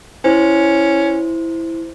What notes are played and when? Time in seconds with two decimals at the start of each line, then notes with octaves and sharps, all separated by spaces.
0.24 C#4 E4 C5